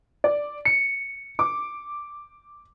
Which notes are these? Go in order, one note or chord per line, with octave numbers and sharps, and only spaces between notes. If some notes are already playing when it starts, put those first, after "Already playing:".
D5
C#7
D6